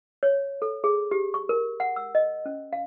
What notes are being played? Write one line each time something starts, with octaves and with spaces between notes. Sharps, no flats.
C#5
A4
G#4
G4
C#6
A#4
F#5
E6
D#5
C#4
F5